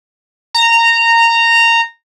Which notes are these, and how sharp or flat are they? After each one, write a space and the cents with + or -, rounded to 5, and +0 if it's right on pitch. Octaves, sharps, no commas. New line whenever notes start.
A#5 -15